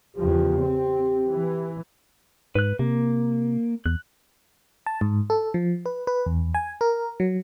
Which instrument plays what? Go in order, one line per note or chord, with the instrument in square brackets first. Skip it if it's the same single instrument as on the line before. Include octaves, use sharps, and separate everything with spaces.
[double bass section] E2 C#3 F3 [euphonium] G4
[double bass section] C4
E3
[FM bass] G#2 [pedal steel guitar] B4 F#6
[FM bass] C3 [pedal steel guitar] A#3
[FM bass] E2 [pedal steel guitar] F#6
[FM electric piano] A5
G#2
A4
F3
B4
B4
E2
G#5
A#4
F#3